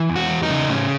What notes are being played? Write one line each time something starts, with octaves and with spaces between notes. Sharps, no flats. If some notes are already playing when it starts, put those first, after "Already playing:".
Already playing: E3
E2
F#4
E2
D#4
C#3
A2 C#4